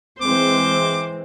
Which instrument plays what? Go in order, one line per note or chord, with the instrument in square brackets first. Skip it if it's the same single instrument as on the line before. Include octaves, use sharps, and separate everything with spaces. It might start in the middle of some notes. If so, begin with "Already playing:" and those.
[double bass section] E3 G#3 C4 [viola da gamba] C5 [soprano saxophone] D6